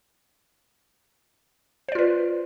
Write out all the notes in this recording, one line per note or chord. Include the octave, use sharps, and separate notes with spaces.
F4 B4 C5 D5